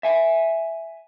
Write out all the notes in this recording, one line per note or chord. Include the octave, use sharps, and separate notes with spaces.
E5 G#5